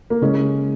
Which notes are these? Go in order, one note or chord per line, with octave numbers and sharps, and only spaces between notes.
A#3
C#3 G#3 C#4